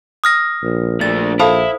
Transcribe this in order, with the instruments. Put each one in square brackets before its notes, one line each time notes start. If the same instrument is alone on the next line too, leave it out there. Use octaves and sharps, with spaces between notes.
[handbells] D#6 F6 A#6
[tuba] A#1
[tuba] A#1 [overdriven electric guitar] A3 D4 [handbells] A6
[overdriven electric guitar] E4 [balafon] A4 F5 A5 [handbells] C5 B5 D#6